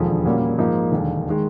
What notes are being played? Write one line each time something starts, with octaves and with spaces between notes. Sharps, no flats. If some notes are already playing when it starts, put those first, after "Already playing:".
Already playing: E1 D#2 D3 F3
A#2 G3 A#3 C#4 F#4
G#2 F3 A#3 D#4
E1 D#2 D3
D#3 G#3